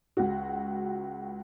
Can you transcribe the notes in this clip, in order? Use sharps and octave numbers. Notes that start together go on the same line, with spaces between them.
C#2 F#4